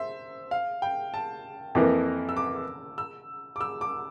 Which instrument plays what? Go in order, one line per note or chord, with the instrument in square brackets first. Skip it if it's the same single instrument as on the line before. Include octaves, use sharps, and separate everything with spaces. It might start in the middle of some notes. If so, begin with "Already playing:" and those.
Already playing: [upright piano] C5 E5
F5
G5
A5
[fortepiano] F2 E3 A#3 [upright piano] D6
[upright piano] E6
D6
E6
D6
E6
D6